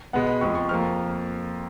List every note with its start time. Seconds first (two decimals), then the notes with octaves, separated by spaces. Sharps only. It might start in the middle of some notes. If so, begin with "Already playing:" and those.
0.13 B2 G#3 B3 F#5
0.27 B5
0.41 F2 F3 G#3 C#6
0.55 C#6
0.69 F2 F3 A#3 F6